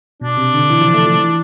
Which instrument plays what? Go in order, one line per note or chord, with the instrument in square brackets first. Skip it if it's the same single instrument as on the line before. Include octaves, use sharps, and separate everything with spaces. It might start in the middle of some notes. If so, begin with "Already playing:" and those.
[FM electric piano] B2 [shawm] D4
[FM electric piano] C3
D3
E3
F3
A3
F3
E3